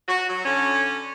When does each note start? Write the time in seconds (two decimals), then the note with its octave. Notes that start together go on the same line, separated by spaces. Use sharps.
0.09 F#4
0.29 F#3
0.45 D3 C#4